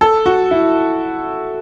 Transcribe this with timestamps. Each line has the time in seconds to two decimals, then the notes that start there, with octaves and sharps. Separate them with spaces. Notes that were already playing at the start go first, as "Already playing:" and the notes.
0.01 A4
0.26 F#4
0.51 E4